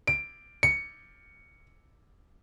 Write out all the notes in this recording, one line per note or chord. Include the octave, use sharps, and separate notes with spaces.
D7
C#7